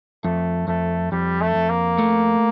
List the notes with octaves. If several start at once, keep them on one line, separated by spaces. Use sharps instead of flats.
F2 A3
F2 A3
F2 G3
A3
F2
A#3
A3